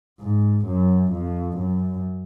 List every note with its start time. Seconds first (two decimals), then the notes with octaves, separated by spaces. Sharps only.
0.20 G#2
0.66 F#2
1.12 F2
1.58 F#2